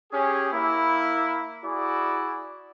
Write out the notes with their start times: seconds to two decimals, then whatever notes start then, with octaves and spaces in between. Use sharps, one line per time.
0.12 C#4 G4 G#4
0.52 A#3 E4
1.64 E4 F#4 G#4 D5